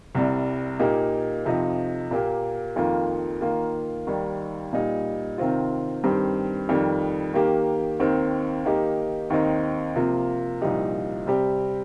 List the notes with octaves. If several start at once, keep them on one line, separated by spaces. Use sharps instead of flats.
C2 C3 G3
A#2 A#3 D#4 G4
F2 C3 F3 D#4
A#2 A#3 G4
F2 D#3 A#3 F4
D#3 A#3 F4
D#2 D#3 G3
A#2 G3 D#4 G4
C3 D#3 C4 F4
G2 D#3 C4 G4
F2 D#3 G3
D#3 A#3 G4
D#2 D#3 C4
D#3 A#3 D#4 G4
D#2 D#3 C4 D#4
C3 F3 A#3 F4
C2 A#2 F3 D#4 G4
C3 G3 C4 G4